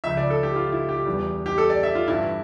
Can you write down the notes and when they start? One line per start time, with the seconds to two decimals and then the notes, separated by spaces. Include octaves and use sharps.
0.04 C#2 C#3 F3 E5
0.17 D5
0.30 A4
0.43 G4
0.56 F4
0.72 E4
0.89 G4
1.06 E2 E3 G3
1.46 G4
1.58 A4
1.70 D5
1.83 E5
1.95 F4
2.08 G2 E3 G3 E4